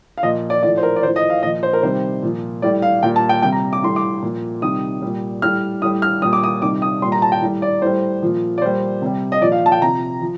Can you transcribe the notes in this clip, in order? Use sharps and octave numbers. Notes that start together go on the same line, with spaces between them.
F5
A#2 F3 D#5
D5
A2 F3 D5
C5
A#4
D5
A2 F3 C5
D#5
F5
A#2 F3 D#5
C5
A#4
C3 D#3 G3 C5
A#2 F3
A2 G3 D5
F5
A#2 G3 G5
A5
G5
C3 G3 G5
A#5
D6
A2 G3 C6
D6
A#2 F3
C3 D#3 G3 D#6
A#2 G3
A2 G3 F6
A2 G3 D#6
F6
A#2 G3 D#6
D6
D#6
C3 D#3 G3 D6
D#6
A#2 G3 C6
A#5
A5
G5
A2 G3
D5
A2 G3 C5
A#2 F3
D5
A#2 G3 C5
C3 G3
D#5
A#2 F3 D5
F5
A5
G5
C3 F3 A#5
F3